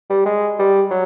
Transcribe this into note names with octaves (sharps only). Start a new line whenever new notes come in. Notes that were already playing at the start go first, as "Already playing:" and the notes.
G3
G#3
G3
F#3